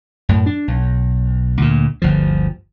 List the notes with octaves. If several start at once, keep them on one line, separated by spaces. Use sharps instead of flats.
F#2 A2
D4
B1
D2 A#2
G1 D2 F3